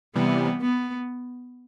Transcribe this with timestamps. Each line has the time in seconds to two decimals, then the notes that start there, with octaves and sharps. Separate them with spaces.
0.15 C3 E3 G3 B3
0.62 B3